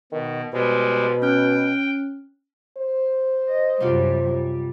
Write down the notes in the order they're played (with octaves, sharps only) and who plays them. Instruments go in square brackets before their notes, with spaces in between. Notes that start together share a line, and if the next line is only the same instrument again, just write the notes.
[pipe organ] B2 [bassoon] D#3
[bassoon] B2 [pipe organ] G3 G#3 [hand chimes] C5
[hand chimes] C#4 F6 F#6 [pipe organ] G5
[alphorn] C5
[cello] D#5
[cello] F#2 G3 [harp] C3 F4 F#4
[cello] G3